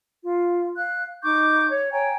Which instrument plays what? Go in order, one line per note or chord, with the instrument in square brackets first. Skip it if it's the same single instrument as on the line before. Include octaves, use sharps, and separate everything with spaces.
[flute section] F4
F5 F#6
[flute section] D#4 C#6 G6 [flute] D6
[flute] C#5
[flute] C#5 [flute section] G5 G#5 A#5